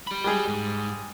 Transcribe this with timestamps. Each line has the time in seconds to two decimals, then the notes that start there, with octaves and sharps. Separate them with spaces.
0.07 G4 B5
0.24 G3 G#3 G#4
0.48 G#2